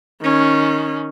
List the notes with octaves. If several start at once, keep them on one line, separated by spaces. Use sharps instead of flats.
D#3 C#4